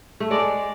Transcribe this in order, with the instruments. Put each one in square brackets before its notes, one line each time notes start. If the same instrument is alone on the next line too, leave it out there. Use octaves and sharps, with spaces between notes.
[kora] A3
[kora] G#3 [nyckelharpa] D5